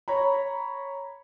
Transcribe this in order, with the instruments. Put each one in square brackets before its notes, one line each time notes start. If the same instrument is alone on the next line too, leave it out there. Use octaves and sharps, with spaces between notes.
[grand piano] C#5 A#5 B5